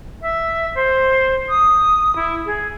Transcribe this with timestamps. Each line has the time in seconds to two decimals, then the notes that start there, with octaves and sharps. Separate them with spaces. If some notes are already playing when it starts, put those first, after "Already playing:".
0.22 E5
0.75 C5
1.49 D#6
2.16 E4
2.46 G#4